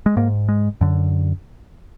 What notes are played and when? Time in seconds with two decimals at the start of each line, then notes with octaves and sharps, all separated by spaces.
0.06 G#3
0.17 G#2 A#3
0.49 G#3
0.81 F#2 D3